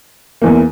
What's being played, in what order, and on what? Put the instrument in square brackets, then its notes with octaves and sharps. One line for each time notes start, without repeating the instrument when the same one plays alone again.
[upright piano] E2 E3 A#3